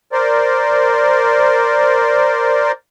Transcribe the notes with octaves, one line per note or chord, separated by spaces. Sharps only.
A#4 C5 D5